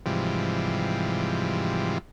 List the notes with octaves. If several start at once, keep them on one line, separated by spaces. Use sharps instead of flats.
G#2 C3 E3 F3 G3